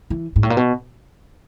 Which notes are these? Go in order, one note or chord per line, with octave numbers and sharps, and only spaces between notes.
E3
G#2
A2
A#2
B2